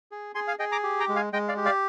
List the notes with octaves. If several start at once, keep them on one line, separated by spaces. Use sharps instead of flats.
G#4
G#4 G#5 C6
F5 G#5
G#4 D#5 G5
A#5 D6
G4
G5 A#5
G#3
F5 G#5
G#3 D#5 G5
D5 F5
G4
D5 F5